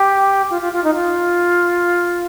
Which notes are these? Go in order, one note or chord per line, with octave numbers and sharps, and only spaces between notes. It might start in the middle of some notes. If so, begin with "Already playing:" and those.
Already playing: G4
F4
F4
F4
D#4
F4